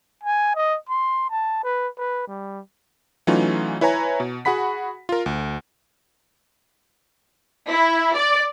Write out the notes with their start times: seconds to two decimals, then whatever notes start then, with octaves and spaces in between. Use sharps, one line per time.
0.24 G#5
0.56 D#5
0.89 C6
1.30 A5
1.63 B4
1.98 B4
2.28 G3
3.27 E3 F#3 A3 C#4 D#4 F4
3.81 E4 B4 C#5 G#5 A#5
4.20 B2
4.45 F#4 G#4 F#5 B5 B6
5.09 F4 A#4
5.26 D2
7.68 E4
8.16 D5